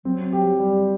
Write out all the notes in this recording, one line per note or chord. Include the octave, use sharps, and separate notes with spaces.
F#3 C4
G4
G3